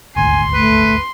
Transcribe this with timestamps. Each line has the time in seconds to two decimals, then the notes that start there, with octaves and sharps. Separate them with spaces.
0.16 D#1 G#1 D2 G#5 C6
0.54 A3 B4